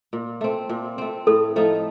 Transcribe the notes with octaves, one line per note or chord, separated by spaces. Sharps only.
A#2
A3 C4
A#2
A3 C4
A2 A4
F3 A3 D#4